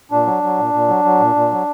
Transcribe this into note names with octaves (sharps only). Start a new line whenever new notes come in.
A#2 D4
F#3
F#3
A#2
A#2
F#3
F#3
A#2
A#2
F#3